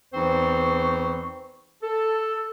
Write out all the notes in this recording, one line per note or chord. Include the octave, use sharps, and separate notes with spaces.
E2 E3 C4 D#4 C5 C#6
A4